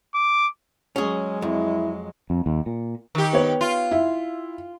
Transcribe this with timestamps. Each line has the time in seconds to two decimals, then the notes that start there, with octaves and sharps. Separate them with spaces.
0.15 D6
0.96 F#3 G#3 C#4 G#4
1.42 F2 E4
2.30 F2
2.46 D#2
2.66 A#2
3.15 D#3 G4
3.33 B3 C#5
3.61 F4
3.91 E4